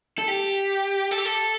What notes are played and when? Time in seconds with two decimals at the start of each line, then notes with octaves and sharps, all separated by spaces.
0.18 A4
0.28 G4
1.11 A4
1.18 G4
1.25 A4